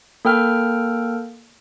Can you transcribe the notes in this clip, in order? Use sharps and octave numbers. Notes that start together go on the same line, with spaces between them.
A#3 A4 G5 F6